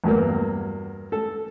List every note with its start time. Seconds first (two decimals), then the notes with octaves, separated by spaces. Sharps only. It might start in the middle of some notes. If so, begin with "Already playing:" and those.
0.04 E2 G2 F#3 A#3
1.12 A4